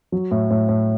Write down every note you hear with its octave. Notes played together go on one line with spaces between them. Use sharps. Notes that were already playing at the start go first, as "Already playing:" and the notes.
F#3
A2
A2
A2